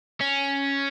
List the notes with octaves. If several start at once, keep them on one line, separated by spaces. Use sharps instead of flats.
C#4